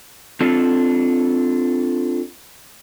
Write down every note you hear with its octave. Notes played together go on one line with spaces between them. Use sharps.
C4 D4 F4 A4